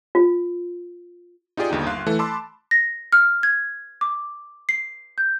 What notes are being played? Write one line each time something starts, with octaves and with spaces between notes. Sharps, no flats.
F4
D#4 F4 G4 G#4 D5
G1 D#2 D3 D#4 G5
G1 F5 C6 F#6
E3 A3 A4
A5 B5 C6 D6 E6
A#6
F6
G#6
D6
C7
G6